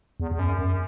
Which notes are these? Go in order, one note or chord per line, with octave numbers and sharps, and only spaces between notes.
E2
E2
F#2
F#2